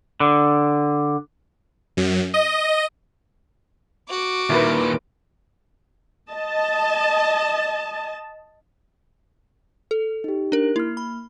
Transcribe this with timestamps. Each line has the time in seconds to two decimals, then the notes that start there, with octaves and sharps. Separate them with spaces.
0.20 D3
1.97 F#2
2.34 D#5
4.10 F#4 D6
4.50 D#2 A#2 E4 A#4 B4
6.32 D#5 A5
9.91 A4
10.24 D#4 G4
10.52 D4 A#4
10.76 A#3 E4 F6
10.97 B5